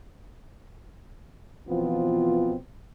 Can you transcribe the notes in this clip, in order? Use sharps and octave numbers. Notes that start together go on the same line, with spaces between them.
B2 E3 F3 B3 C4 F4